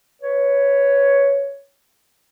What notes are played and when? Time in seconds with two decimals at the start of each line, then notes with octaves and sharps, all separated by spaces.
0.21 B4 C#5